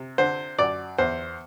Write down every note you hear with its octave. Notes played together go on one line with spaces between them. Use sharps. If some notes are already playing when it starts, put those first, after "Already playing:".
Already playing: C3
D3 C5
F#2 D5
E2 C5